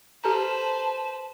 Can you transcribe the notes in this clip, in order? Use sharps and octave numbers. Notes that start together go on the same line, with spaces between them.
G4 A4 B4 C5 A5 A#5